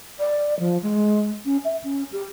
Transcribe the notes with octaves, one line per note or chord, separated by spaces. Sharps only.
D5
F3
G#3
C#4
E5
C#4
G4